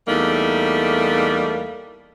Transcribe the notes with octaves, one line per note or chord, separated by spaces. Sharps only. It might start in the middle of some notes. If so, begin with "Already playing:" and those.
E2 G3 A3 A#3 D#4